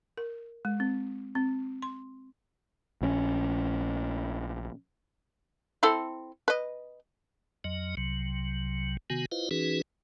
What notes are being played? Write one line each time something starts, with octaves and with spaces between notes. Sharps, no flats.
A#4
G#3
C4
C4
C6
A#1 C4 C#4
C4 E4 A4
B4 D#5
F2 F#3 D#5
C2 C3 F#3
C3 D#3 B3 F#4 G#5
E4 F4 B4 C5 D#5 F5
E3 C#4 D#4 F#4 G#4 B4